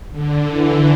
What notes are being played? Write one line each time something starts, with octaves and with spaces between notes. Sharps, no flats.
D3
D3 E3